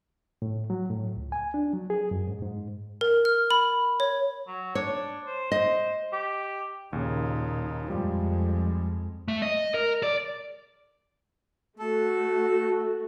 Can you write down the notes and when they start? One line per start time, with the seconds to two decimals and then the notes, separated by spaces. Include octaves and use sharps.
0.42 A2
0.70 F#3
0.90 A2
1.17 C#2
1.32 G#5
1.54 D4
1.73 F#3
1.90 G#4
2.11 F#2
2.28 G#2
2.42 G#2
3.01 A#4
3.25 F6
3.51 B5
4.00 C#5
4.47 F#3
4.75 D4 C#5
5.26 C5
5.52 C5 D#5
6.12 G4
6.93 D#2 A#2 C#3 D#4
7.88 F2 F3 G3 G#3
9.28 A3
9.42 D#5
9.74 A#4
10.03 D5
11.79 A3 F#4 A4